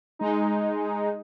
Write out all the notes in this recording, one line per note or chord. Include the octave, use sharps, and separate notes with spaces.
G#3 D#4